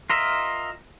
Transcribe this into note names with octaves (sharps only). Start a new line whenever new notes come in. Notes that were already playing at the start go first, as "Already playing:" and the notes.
F4 A#4 D#5 E5